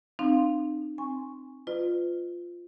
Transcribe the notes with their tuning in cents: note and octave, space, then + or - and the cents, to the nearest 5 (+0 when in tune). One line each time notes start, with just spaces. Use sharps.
C4 +0 D#4 -35 F5 +0
C4 +0 G#5 -10 C#6 +0
F4 +0 B4 +35 D#5 -45